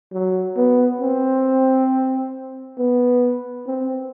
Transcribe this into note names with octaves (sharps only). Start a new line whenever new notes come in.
F#3
B3
C4
B3
C4